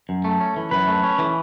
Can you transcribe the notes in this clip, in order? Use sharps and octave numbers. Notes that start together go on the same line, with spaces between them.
F#2
A3
C#4
E3
F#2 B4
A3
C#4
E3